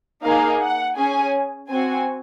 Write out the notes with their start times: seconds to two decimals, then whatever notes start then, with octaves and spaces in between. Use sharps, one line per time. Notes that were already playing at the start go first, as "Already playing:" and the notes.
0.24 A#3 D#4 G#4 F5
0.60 F#5
0.97 C#4 G#4 G#5
1.70 C4 F#4 G#5